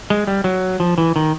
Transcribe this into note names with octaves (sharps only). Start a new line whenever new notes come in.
G#3
G3
F#3
F3
E3
D#3